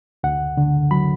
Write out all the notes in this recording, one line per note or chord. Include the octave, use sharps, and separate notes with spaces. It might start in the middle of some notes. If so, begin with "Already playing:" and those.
D2 F#5
D3
F#3 B5